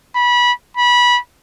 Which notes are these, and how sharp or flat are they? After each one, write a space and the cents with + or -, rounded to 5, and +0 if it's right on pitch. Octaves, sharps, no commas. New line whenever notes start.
B5 -25
B5 -20